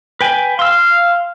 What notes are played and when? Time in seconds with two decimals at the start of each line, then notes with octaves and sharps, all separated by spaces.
0.21 B4 G5 G#5
0.59 F5 C6 E6